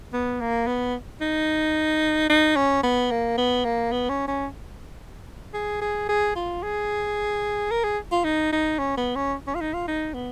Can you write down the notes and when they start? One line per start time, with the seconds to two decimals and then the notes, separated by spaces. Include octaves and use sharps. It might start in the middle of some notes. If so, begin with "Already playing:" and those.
0.13 B3
0.41 A#3
0.67 B3
1.21 D#4
2.30 D#4
2.56 C#4
2.83 B3
3.11 A#3
3.38 B3
3.65 A#3
3.92 B3
4.09 C#4
4.28 C#4
5.54 G#4
5.82 G#4
6.09 G#4
6.36 F4
6.63 G#4
7.71 A#4
7.84 G#4
8.12 F4
8.24 D#4
8.52 D#4
8.79 C#4
8.97 B3
9.15 C#4
9.47 C#4
9.55 F4
9.61 D#4
9.74 F4
9.88 D#4
10.14 B3